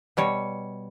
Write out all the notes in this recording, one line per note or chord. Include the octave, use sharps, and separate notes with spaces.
B2 G3 C#5